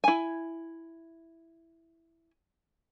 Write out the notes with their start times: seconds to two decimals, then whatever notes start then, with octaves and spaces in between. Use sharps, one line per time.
0.04 E4 G#5